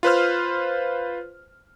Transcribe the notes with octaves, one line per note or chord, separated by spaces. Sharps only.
F4 B4 C5 F6